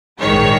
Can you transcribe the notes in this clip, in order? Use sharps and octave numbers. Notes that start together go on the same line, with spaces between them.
A#1 G#2 D#3 G#3 C#5